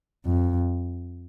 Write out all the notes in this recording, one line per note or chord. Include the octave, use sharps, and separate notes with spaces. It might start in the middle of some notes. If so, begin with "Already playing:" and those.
F2